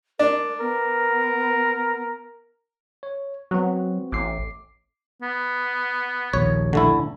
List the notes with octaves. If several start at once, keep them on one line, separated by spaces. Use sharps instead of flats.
D4 A#4
B3 A#4
C#5
F#3 B3 C4 F#4
A1 D6 C7
B3
A#1 D#2 C#5
D3 A3 E4